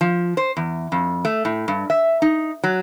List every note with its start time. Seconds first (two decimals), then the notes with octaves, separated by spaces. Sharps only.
0.01 F3
0.37 C5
0.57 E2
0.92 F2
1.25 A3
1.45 A2
1.68 G2
1.90 E5
2.22 D#4
2.64 F#3